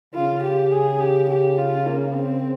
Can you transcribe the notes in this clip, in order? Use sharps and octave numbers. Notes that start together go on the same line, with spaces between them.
C#3 F4
G4
G#4
G4
G4
F4
A#3
C4